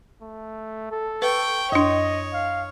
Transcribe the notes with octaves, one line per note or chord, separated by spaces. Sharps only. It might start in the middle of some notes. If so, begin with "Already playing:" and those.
A3
A4
B4 G5 C#6
F#2 D4 C#5 D#5
F5